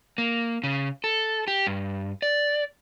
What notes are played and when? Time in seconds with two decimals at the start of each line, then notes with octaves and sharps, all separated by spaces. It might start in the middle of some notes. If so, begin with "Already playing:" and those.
0.18 A#3
0.64 C#3
1.04 A4
1.48 G4
1.67 G2
2.22 D5